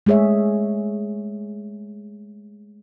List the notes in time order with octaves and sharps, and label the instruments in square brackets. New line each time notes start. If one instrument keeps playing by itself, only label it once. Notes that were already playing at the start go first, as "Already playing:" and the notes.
[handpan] G#3 A3 G#4 C#5 E5